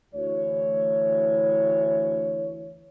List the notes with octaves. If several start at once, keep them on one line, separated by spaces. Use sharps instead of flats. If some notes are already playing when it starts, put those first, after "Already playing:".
D2 E3 C#5